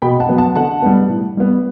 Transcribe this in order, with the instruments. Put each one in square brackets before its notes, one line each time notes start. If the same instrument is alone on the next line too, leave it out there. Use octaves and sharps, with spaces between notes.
[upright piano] B2 G5 B5
F#5 A5
F#3 B3
F#5 A5
D3 F#5 A5
G3 B3
A2
G3 B3